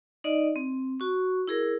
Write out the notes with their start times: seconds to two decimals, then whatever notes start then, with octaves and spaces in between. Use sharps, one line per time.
0.24 D#4 D5 D#5
0.56 C4
1.00 F#4 C#6
1.47 E4 G#4 A#4